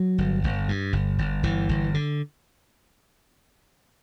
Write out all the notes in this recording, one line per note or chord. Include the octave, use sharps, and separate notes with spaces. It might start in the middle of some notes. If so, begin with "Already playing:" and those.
Already playing: F#3
G1
G1
G2
G1
G1
G1 E3
G1
D3